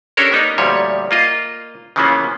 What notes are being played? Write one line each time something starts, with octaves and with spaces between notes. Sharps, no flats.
C#4 D4 G4 A4 A#4 C#5
A#3 B3 D#4
D2 A#2 F3 G3 C#5
A#3 F4 D#5
C#3 E3 F3 A#3 B3 C#4